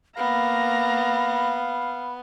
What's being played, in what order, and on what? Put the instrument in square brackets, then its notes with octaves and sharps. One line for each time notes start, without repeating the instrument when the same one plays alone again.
[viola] A#3 A#5 [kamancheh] B3 [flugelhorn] F5 [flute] B5